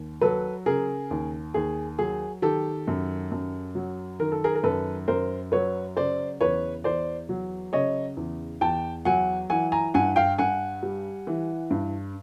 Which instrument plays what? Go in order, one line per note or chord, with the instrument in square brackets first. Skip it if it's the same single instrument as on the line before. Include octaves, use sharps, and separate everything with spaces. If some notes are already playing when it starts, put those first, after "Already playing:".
Already playing: [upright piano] D#2
F#3 A4 B4
C#3 G#4 A#4
D#2
D#2 G#4
F#3 G#4
D#3 G4 A4
F#2
F#2
F#3
D#3 A#4
A4
G#4 A#4
A#4
F#2 A4 B4
F#2 A#4 C5
F#3 B4 C#5
C#3 C5 D5
E2 B4 C#5
E2 C5 D5
F#3
C#3 C#5 D#5
E2
E2 G5 A5
F#3 F#5 G#5
E3 F#5 G#5
G#5 A#5
G2 F#5 G#5
F5 G5
G2 F#5 G#5
G3
E3
G2